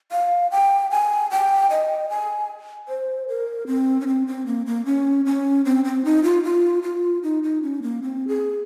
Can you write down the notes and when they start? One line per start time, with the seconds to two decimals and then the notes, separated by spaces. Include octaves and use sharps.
0.12 F5
0.52 G5
0.91 G#5
1.31 G5
1.71 D#5
2.10 G#5
2.88 C5
3.28 A#4
3.67 C4
4.01 C#4
4.07 C4
4.27 C4
4.46 A#3
4.66 A#3
4.85 C#4
5.26 C#4
5.65 C4
5.85 C4
6.05 D#4
6.24 F4
6.44 F4
6.83 F4
7.23 D#4
7.43 D#4
7.62 C#4
7.82 A#3
8.02 C4
8.28 G#4